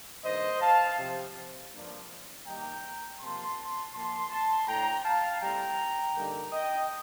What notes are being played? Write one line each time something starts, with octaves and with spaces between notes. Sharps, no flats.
G2 D#3 A#3 D#4 C5 D#5
F5 A5
C3 F3 C4
G2 F3 A#3 D4
D#3 G3 A#3 D#4 G5 A#5
C3 F3 A#3 A5 C6
A#2 F3 A#3 A5 C6
A5 C6
A2 A3 D4 G5 A#5
F5 A5
A2 G3 C4 G5 A#5
D3 G3 A#3 D#4
D#5 G5